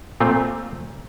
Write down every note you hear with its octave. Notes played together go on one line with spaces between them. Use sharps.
A#2 A3 C4 F4